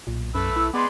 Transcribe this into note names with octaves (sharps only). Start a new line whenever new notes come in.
B1 A#2
F#2 A3 B4 E5
E4 E6
G#3 B3 B4 D5 C6